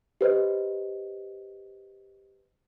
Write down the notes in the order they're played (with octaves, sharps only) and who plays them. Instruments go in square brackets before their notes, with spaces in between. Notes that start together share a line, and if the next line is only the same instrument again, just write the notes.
[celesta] G4 B4 C5 D#5